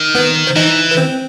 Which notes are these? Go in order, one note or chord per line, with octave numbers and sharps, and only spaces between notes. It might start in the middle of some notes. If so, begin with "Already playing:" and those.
Already playing: D#3
B3 B4
C5
E3 D#4 D#5
B4
C4 C5